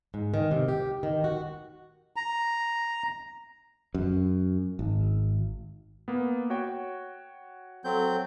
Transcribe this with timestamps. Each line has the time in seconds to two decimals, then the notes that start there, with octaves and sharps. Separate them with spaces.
0.14 G#2
0.34 D#3
0.51 C3
0.68 G4
1.03 D#3
1.24 F#4
2.16 A#5
3.94 F#2
4.79 G#1
6.08 A#3 B3
6.50 F#4 C#5 G5
7.84 F#3 C4 A4 G6